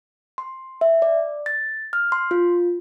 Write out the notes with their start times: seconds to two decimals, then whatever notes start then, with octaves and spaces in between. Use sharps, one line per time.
0.38 C6
0.81 E5
1.02 D5
1.46 A6
1.93 F6
2.12 C6
2.31 F4